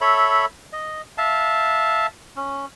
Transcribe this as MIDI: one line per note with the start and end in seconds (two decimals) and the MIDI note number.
0.01 0.45 69
0.01 0.45 73
0.01 0.45 76
0.01 0.45 83
0.73 1.02 75
1.18 2.07 76
1.18 2.07 77
1.18 2.07 81
2.37 2.66 61